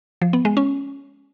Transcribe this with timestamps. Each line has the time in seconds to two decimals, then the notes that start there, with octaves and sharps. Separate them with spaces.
0.22 F3
0.33 B3
0.45 G#3
0.57 C#4